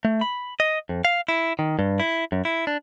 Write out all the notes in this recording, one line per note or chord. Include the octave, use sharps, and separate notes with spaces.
A3
B5
D#5
F2
F5
E4
D#3
G2
E4
F#2
E4
D4